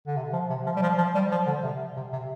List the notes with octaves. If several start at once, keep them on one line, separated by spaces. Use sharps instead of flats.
D3
C3
F3
C3
F3
G3
F3
F3
G3
F3
D3
C3
C3
C3